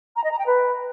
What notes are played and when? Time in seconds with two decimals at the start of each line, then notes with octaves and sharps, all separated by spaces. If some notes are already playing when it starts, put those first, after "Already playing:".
0.16 A#5
0.23 D#5
0.31 A#5
0.39 G5
0.46 B4